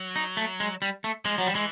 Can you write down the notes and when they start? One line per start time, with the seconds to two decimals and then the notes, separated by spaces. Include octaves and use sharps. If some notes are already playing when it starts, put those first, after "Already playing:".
Already playing: F#3
0.16 D#4
0.37 A3
0.60 G#3
0.82 G3
1.04 A3
1.25 F3 G#3
1.38 F#3
1.47 G3
1.55 E3 G#3